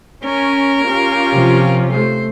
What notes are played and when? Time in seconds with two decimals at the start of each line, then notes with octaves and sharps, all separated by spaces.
0.24 C#4 A#4
0.85 C#4 F4 G4
1.32 C3 F3
1.91 A3 C5